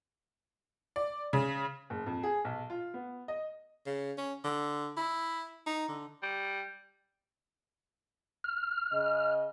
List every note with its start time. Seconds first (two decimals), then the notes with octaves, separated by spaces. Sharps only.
0.96 D5
1.33 C#3
1.90 F#1
2.06 F2
2.23 G#4
2.45 B1
2.70 F4
2.94 B3
3.28 D#5
3.86 C#3
4.18 C#4
4.44 D3
4.97 E4
5.66 D#4
5.88 D3
6.23 G3
8.44 F6
8.93 C#3 D#5